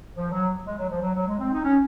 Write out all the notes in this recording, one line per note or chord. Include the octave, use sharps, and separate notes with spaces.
F3
F#3
G#3
F#3
F3
F#3
F#3
G#3
C4
D#4
C#4